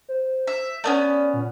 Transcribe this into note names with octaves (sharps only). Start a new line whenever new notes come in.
C5
E5
A3 B3 C#4 D5
A#2